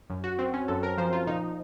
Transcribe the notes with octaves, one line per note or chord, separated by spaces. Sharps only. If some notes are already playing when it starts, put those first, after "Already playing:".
F#2
F#4
C4
C#4
F#2 A4
A#4
F3 C5
F4
A#2 D#4